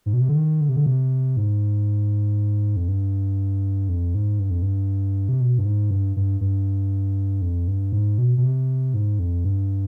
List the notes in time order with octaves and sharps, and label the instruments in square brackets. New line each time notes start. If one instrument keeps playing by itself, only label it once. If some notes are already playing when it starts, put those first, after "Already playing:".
[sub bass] G#2
B2
C3
D3
D#3
D3
C3
D3
C3
G#2
F2
G2
F2
G#2
G2
F2
G2
C3
B2
G2
G#2
G2
G2
G2
F2
G2
G#2
B2
B2
C3
G#2
F2
G2